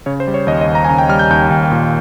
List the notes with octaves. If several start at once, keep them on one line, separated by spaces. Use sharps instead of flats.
C#3 C#5
C5
G3
C#5
D#2 D#5
D#5
D#2
A#5
G#5
C#3 A#5
G5
G3 F6
G6
D#2 G6
D#2
A#2